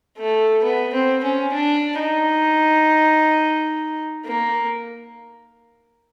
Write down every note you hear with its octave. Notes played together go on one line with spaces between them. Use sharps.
A3
B3
C4
C#4
D4
D#4
A#3